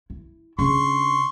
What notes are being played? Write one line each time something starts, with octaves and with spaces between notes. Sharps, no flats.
E4
C#3 D4 C6 C#6